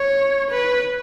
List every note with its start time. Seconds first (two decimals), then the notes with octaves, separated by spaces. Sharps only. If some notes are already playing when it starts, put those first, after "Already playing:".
Already playing: C#5
0.50 B4